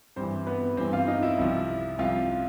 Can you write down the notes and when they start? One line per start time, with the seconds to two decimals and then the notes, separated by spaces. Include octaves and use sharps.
0.16 G2 E3 C4 C5
0.46 B3 B4
0.77 G2 E3 C4 C5
0.93 F4 F5
1.08 D#4 D#5
1.22 E4 E5
1.38 C2 C3 F3
1.99 C2 C3 F3 F4 F5